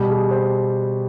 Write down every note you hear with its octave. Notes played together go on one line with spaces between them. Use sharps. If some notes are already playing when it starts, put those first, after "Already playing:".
Already playing: B2 G3 G4
G#4
C5